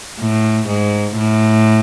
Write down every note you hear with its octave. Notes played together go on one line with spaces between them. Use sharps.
A2
G#2
A2